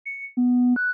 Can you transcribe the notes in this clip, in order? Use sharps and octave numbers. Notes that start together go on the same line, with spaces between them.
C#7
B3
F#6